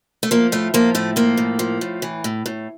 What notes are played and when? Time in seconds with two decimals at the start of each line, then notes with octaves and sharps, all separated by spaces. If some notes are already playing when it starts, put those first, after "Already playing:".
0.23 A3
0.31 F3 A#3
0.52 A2 A3
0.74 F3 A#3
0.95 A2 A3
1.16 F3 A#3
1.37 A2
1.59 F3
1.81 A2
2.02 E3
2.24 A2
2.46 A2